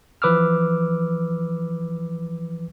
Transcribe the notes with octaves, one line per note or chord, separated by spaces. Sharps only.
E3 F3 B4 D6 E6 F6